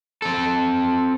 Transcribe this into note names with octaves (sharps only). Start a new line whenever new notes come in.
C4 A4